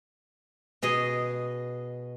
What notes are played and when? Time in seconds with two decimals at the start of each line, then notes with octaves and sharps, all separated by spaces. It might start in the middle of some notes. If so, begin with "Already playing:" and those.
0.82 B2 G#4 D#5